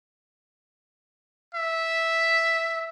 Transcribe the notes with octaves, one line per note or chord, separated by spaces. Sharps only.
E5